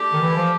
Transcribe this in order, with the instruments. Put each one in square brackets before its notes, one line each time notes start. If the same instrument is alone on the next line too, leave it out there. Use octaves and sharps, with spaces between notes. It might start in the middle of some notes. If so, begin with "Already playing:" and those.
Already playing: [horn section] A3 D4 G4
[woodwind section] D#3
E3
F3